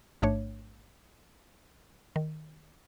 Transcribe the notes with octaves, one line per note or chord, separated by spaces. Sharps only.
A1 G#2 A3 D4 C#5
D#3